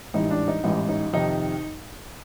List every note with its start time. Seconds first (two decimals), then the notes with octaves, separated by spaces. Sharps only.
0.14 A1 G#2 E3 G3 D#4
0.31 D4
0.48 D#4
0.64 A1 G#2 E3 G3 D#4
0.89 D#4
1.13 F2 C3 D#3 D#4